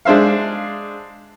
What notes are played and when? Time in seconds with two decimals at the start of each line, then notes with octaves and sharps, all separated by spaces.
0.05 G#3 D4 C5 E5 F5